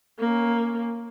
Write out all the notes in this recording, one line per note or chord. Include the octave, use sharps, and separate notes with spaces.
A#3 C#4